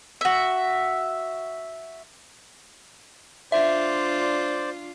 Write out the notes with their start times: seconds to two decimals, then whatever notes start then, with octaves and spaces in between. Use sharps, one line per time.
0.21 F#4 E5
3.52 D4 F4 C5 D5 E5